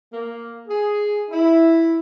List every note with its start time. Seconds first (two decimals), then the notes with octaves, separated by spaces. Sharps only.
0.13 A#3
0.68 G#4
1.31 E4